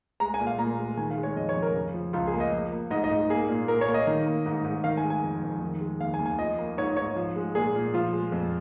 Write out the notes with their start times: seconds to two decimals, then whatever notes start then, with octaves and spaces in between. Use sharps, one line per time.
0.20 G#3 A#5
0.34 G#5
0.40 A#2
0.47 F5
0.59 A#2 A#5
0.79 G#3
0.97 D#3 G#5
1.11 F5
1.17 G#3
1.23 C#5
1.36 F2 D#5
1.49 C#5
1.55 F2
1.62 A#4
1.75 C#3
1.94 F3
2.13 C#2 F4
2.27 G#4
2.33 A#3
2.40 D#5
2.52 F3
2.72 A#3
2.91 G#2 D#5
3.04 D#5
3.11 G#2
3.30 A#3 G#4
3.49 A#2
3.68 A#2 A#4
3.81 C#5
3.88 A#3
3.94 D#5
4.07 D#3
4.26 A#3
4.46 G#2
4.65 G#2
4.84 D#3 F5
4.97 G#5
5.04 G#3
5.10 G#5
5.23 F2
5.43 F2
5.61 D#3
5.81 G#3
6.00 D#2 F5
6.14 G#5
6.19 D#2
6.26 G#5
6.39 F3 D#5
6.58 A#3
6.78 G#2 C#5
6.97 G#2 C#5
7.16 F3
7.36 G#3
7.55 A#2 G#4
7.75 A#2
7.94 F3 F4
8.13 G#3
8.32 F2